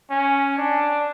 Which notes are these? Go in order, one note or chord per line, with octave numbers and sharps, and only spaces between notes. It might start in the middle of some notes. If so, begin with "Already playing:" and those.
C#4
D4